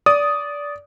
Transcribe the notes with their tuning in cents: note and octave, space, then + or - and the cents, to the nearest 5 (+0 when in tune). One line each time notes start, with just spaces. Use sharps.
D5 -20 D#6 +0